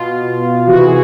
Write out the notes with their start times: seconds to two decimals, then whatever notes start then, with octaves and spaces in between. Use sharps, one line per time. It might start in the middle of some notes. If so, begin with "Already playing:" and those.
Already playing: B2 F4
0.67 C3 E3 F#4
0.85 G#4